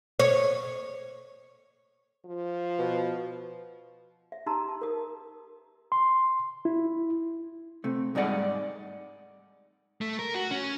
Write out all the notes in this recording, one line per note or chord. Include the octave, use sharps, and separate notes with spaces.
C#5
F3
B2
E5
D#4 G4 A5 A#5 C6 E6
A5
A#4 D#6
C6
E4
C3 A3
G#2 G3 D#4 G#4 D5 F#5
A3
A#4
F#4
C#4